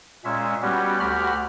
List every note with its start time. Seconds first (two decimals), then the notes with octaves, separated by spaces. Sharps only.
0.25 A#2 G#3 C#4 E5
0.62 G3 B3 C#4 F#4 G4
1.00 D2 F#4 G4 B5 F6